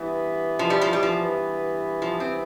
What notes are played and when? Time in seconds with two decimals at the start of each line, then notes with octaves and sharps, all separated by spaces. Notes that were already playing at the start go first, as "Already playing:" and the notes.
Already playing: G2 E3 B3
0.59 F3
0.70 G3
0.81 F3
0.93 G3
1.03 F3
2.02 F3
2.20 C4